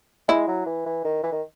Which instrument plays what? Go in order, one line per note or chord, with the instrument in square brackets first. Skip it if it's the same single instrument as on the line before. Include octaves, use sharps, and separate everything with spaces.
[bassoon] G#3 [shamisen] E4
[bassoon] F#3
E3
E3
D#3
E3
D#3